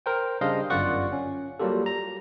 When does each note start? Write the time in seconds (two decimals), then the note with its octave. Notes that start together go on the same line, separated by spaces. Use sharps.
0.06 A#4 C5 G5
0.41 C#3 G3 D4 C5 D#5 F5
0.70 G1 F#2 F4 D5 F#5 C#6
1.12 C#4
1.59 F#3 G3 A#3 F4 G4 A4
1.86 A#5